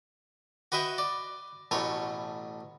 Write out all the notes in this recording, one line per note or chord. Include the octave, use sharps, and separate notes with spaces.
F#4 B4 D#5 E5 G5
D5
A1 B2 A3 C#5